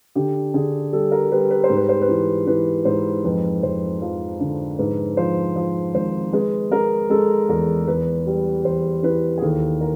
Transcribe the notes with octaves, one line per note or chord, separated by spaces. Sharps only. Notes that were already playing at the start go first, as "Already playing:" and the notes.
D3 G4
D3 G#4
G3 A4
A#4
G3 B4
B4
C5
G#2
B4
C5
B4
E3
E3 B4
G#2 C5
F2 B4
F2 C5
F3
D3
G#2 B4
F3 C5
F3
G#1 C5
G#3 B4
G#3 A#4
G#3 A4
E2 A#4
E2 B4
G3
E2 C5
E3 B4
G#4
D#2 A4
A#4